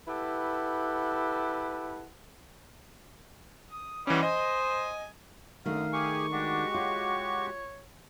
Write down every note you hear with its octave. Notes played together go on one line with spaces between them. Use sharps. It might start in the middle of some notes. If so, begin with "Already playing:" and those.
E4 G4 A4 B4 F#5
D#6
E3 G3 C#4 C5 D#5 F#5
C5 D#5 G#5 D#6
F#2 D3 D#3 A3 F5 D#6
G4 G#4 G#5 C#6
G#3 D4 F#4 G4
F4 C#5